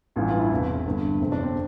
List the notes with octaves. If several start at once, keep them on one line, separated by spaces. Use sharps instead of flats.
A1 G2 E3 F4
F4
E4
E1 E2 C3
G1 G2 D3
G1 F2 C3 C4
D4
C4